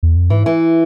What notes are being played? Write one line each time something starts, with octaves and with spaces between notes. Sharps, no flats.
E2
F2
G#2 E3
E3